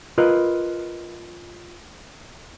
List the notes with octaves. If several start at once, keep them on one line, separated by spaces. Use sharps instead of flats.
F4 A#4 B4 D#5